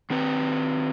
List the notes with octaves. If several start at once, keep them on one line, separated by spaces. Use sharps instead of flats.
D#3 C4 B4